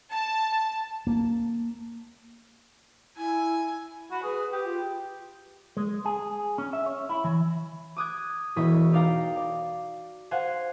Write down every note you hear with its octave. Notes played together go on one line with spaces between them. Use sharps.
A5
A#3
E4 G#5
F#4 B5
G#4 B4
G4 D#6
F4
G#3
G#4
C#4
E5
C#5
E4
E3
D6 D#6 F#6 G#6
E1 E4 C#5 D#5 B5
D#4 D5 F5 G5 A#5
D5
C5 F5 F#5 G#5